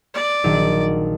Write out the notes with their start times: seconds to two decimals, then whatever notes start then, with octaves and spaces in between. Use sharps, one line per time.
0.14 D5
0.44 A#1 D#3 F#3